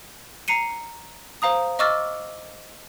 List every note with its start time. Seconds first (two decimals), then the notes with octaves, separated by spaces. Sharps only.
0.48 A#5 C7 C#7 D#7
1.42 C5 F5 A#5 D#6
1.79 D#5 C#6 D6 E6 F6 A6